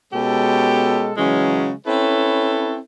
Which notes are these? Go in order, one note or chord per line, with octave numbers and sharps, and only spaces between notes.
B2 G#3 C#4 G4 A4
C#3 E3 F#3 G#3 C#4
C4 C#4 E4 A4 B4 C#5